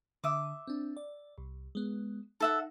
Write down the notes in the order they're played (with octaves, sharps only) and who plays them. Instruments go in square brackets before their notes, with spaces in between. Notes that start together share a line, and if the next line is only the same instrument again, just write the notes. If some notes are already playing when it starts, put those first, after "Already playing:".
[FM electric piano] D3 D#6 [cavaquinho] E5 D6
[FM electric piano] C4 D4
D5
C2
G#3 B3
[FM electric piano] D#4 [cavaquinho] A4 E5 F#5